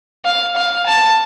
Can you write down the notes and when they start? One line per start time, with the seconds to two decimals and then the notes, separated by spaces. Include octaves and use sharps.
0.25 F5
0.56 F5
0.86 A5